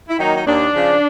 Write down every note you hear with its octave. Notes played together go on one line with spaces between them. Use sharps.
E4
D#3 F#3 A#3 D#4
D#4
D#2 D4
C#3 F3